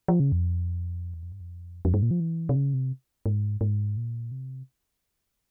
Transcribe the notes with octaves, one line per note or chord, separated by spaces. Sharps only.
F3
C#3
F2
E2
F2
G2
F2
F2
G2
A#2
F3
E3
C3
C#3
C3
G#2
G#2
A#2
C3